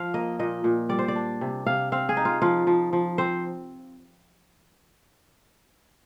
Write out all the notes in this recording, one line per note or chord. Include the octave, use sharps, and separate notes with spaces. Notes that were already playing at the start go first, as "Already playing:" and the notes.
Already playing: F3 F5
A#3 D#5
A#2 D#5
A#2
G3 D5
C5
D5
D4
C3
C3 F5
C4 F5
G#4
D#4
F4
F3 F4
F3
F3
C4 C5